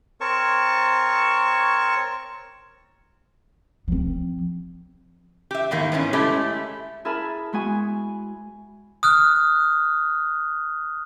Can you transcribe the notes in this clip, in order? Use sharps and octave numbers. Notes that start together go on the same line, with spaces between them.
C4 A#4 C#5 A5 C#6
F3 C4
G4 E5
E2 G#2 D#3 A#3
G#2 B3 C#4 E4
G#3 A3 C#4 E4 G4
E4 G#4 A#4 E5 A5 B5
G#3 B3 F#4 G#5
D#6 F6 F#6